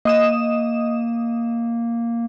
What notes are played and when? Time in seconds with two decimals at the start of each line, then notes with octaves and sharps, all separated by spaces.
0.05 A#3 D#5 D#6 E7